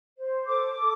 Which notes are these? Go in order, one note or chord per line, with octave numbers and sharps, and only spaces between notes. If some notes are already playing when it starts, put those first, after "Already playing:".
C5
A4 D6
A4